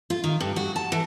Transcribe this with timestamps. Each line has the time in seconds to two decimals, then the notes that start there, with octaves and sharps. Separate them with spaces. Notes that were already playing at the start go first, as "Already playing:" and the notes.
0.10 F4
0.24 D#3
0.40 G2
0.56 F#4
0.76 A5
0.92 E3